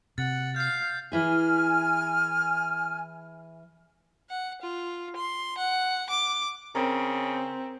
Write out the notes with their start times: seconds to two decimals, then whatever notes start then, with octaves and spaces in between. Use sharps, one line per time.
0.18 C3 F#5 A6
0.56 F5 G6 C7
1.12 E3 E4 G#4 G#5 F6
4.30 F#5
4.62 F4
5.16 C6
5.58 F#5
6.10 D6
6.75 C#3 C4 A#4 C#5